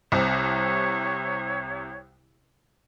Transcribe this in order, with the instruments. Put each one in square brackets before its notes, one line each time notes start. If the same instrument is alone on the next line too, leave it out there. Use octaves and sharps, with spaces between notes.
[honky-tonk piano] C2 C3 [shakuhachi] C#5